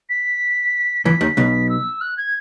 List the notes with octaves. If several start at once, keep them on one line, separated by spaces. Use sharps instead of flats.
B6
E2 E3 B6
D#2 D#3
B1 B2
E6
F#6
G#6